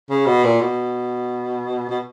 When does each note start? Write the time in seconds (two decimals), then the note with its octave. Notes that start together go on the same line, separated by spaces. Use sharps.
0.10 C#3
0.26 B2
0.44 A#2
0.61 B2
1.89 B2